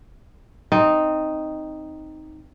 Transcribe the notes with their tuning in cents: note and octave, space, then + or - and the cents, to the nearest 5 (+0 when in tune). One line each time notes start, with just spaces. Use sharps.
C4 +0 D#4 +0